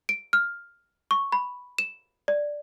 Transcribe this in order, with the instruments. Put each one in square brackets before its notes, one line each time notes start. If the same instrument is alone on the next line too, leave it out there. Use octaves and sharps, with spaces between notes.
[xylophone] D7
F6
C#6
B5
E7
D5